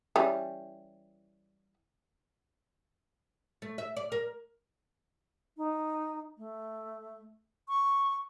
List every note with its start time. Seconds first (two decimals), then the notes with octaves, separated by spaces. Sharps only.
0.16 E3 G3 C#4
3.62 A3
3.78 E5
3.97 D5
4.12 A#4
5.57 D#4
6.38 A3
7.68 C#6